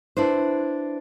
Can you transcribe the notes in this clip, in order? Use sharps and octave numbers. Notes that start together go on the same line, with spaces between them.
D4 E4 B4 C5